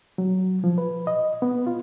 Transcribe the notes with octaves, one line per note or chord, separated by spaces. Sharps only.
F#3
F3
B4
D#5
B3
F4